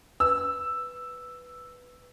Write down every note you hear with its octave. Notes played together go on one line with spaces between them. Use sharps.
B4 E6